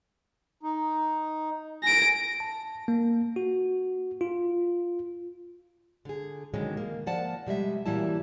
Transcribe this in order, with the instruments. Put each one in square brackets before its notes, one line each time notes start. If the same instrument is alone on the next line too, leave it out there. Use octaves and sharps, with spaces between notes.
[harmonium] D#4
[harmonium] G#5 [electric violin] A#6 D7
[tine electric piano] A5
A#3
F#4
F4
[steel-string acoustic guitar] D3 G#4
B2 D3 D#3 F#3 G#3 C#4
A#3
F3 A#3 D5 F#5 A5
B2 G3 G#3 E5
A#2 E3 F#3 G3 E4 A5